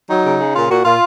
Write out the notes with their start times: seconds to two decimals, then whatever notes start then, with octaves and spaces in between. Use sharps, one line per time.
0.09 F#3 D#4
0.24 C#3
0.40 C#3
0.55 A#2 F4
0.70 A#2 F#4
0.84 A#2 F4